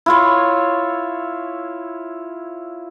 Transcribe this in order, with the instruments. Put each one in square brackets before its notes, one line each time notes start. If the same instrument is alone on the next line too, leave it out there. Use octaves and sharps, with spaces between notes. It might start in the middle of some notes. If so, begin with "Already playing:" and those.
[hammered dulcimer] E4 F4 C#5